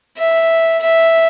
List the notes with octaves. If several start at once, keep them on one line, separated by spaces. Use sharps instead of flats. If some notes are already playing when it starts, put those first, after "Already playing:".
E5
E5